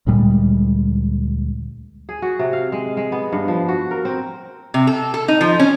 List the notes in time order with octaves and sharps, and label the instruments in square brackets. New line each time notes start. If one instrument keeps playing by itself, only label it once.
[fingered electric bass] D2 A#2 G3 G#3
[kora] G#4
F#4
C3
F5
G#3
G#3
B3
G2
F3
F#4
A#4
C4
[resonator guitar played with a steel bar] C3
A4
A4
D#4
F3
C#4